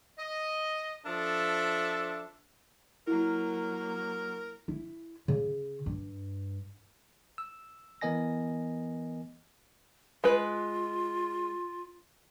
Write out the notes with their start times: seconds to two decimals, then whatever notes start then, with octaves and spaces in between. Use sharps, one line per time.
0.18 D#5
1.06 F3 D4 A4 E5
3.07 F#3 A#3 E4 A#4
4.68 E4
5.28 C#3
5.86 G2
7.38 E6
8.01 E3 B3 A#4 D#5 G#5 A#6
10.24 G#3 F4 B4